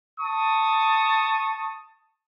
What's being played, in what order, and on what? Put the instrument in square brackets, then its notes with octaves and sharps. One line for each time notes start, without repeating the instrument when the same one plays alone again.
[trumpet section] A5 C#6 D#6